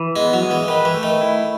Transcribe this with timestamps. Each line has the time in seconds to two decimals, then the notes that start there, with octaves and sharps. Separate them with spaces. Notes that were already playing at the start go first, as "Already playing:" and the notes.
Already playing: E3
0.16 G#3 B3
0.33 F#3
0.42 G#3
0.51 E3
0.68 D#3 B4
0.85 E3
0.94 A3
1.03 D#3
1.21 E4